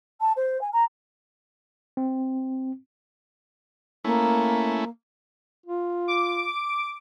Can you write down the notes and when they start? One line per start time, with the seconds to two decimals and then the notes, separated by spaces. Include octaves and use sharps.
0.20 A5
0.36 C5
0.61 G#5
0.73 A#5
1.97 C4
4.05 A3 A#3 C#4 E4
5.66 F4
6.08 D6